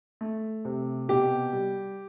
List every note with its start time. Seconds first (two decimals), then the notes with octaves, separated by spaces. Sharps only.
0.21 A3
0.65 C3
1.09 B2 G4
1.53 G3